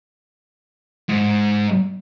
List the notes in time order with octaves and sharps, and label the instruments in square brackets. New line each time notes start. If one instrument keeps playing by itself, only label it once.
[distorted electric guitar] G#2